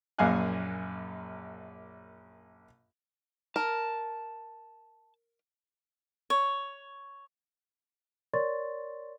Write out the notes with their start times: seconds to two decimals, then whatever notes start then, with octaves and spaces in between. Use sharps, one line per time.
0.19 A#1 F#2 A#2 F5 G#5 F#6
3.56 A#4 A5
6.30 C#5
8.34 A#4 C#5 D5 C6 C#6 A6